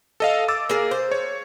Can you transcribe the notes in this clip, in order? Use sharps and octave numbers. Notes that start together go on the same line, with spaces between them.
A4 D#5 F5
D6 E6 A6
A#3 G#4
C5
C#5